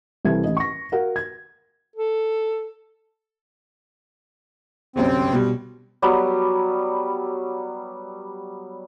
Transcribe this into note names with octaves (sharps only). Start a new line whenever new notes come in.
C2 E3 C4 A4 G#6
A1 D#5
C#6 A#6
F#4 A#4 F5 F#5
G#6
A4
G1 C2 F#2 C4
B2 G3
F#3 G3 B3